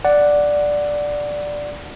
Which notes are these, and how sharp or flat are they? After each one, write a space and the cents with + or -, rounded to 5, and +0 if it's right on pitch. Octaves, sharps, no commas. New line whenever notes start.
D5 +0 F#5 +0